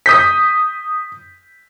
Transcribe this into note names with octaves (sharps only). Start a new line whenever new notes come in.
D#6 G6 B6